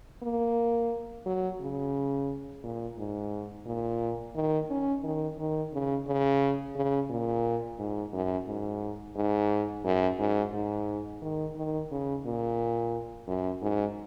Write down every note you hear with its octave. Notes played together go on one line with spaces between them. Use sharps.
A#3
F#3
C#3
A#2
G#2
A#2
D#3
C#4
D#3
D#3
C#3
C#3
C#3
A#2
G#2
F#2
G#2
G#2
F#2
G#2
G#2
D#3
D#3
C#3
A#2
F#2
G#2